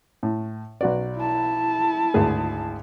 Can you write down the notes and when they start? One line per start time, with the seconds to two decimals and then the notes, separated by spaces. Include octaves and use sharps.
0.23 A2
0.81 B1 F#4 D5
1.16 E4 A5
2.14 G#1 D2 G#4